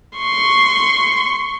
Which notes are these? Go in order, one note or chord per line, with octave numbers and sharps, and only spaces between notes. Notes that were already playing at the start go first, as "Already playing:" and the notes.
C6 C#6